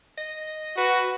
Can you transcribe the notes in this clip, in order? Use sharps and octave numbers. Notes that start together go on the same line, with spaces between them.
D#5
F#4 B4